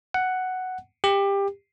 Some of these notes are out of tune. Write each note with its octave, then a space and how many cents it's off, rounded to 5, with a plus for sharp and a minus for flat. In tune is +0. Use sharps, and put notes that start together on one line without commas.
F#5 +5
G4 +20